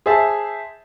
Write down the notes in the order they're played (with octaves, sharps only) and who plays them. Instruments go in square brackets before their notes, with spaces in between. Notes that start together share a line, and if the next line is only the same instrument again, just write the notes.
[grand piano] G#4 C5 E5 A5